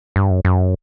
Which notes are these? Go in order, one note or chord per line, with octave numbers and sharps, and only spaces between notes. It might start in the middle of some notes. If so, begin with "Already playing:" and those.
G2
F#2
F#2